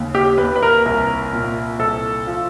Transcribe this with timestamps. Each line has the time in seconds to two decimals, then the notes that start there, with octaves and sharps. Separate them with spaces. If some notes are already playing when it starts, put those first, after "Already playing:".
Already playing: D#2 C#3
0.15 G4
0.38 D#2 B4
0.56 B4
0.62 A#4
0.86 C2 A#4
1.33 A#2
1.79 C2 A4
2.27 F3